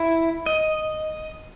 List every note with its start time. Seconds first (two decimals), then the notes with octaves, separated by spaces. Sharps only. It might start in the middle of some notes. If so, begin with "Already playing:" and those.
Already playing: E4
0.46 D#5